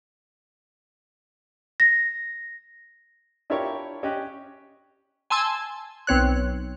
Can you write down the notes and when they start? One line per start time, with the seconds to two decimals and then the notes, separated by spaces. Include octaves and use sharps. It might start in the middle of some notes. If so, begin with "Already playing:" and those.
1.80 A#6
3.50 D4 E4 F4 G4 A#4 C#5
4.03 C#4 G4 D#5 G5 F#6
5.30 G#5 A5 C6 E6 G#6
6.07 B1 C4 C#5 F#6